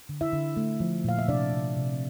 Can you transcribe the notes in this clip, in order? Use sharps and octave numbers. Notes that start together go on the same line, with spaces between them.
D3
E4 E5
D3
A3
F3
A#2 F5
E5
C3 D4 D5
C3
C3